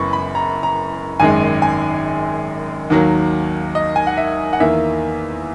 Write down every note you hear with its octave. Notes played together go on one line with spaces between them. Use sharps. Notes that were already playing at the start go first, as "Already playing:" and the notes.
Already playing: F#1 F#2 E3 G#3 B3 B5 C#6
B5
A#5
A#5
G#1 F#2 D#3 G#3 G#5
G#5
D#2 D#3 F#3 A#3
D#5
G#5
F#5
E5
F#5
E2 D#3 A#3 E5